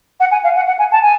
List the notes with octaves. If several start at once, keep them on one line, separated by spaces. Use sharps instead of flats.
F#5
G#5
F5
F#5
F#5
G#5
A5
G#5